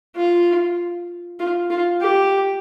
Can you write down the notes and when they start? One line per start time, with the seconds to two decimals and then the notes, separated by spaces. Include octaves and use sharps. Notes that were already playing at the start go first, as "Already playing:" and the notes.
0.16 F4
1.40 F4
1.70 F4
2.02 G4